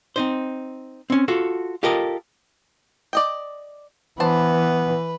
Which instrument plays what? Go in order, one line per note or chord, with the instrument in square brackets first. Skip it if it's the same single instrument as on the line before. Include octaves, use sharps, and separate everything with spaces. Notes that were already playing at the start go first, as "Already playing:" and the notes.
[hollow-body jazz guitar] C4 D#4 C5
C4 C#4
F4 F#4 A4
F4 G4 A4 A#4 D#5
[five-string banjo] D5 D#5 G5
[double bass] E3 [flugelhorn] B3 [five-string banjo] D4 C5 A5 [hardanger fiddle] B4